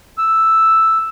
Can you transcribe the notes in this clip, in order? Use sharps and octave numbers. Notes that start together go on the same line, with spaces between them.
E6